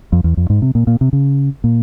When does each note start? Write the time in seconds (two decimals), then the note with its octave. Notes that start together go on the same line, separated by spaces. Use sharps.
0.12 F2
0.24 E2
0.37 F2
0.50 G#2
0.62 C3
0.75 A#2
0.87 A#2
1.01 C3
1.13 C#3
1.64 A#2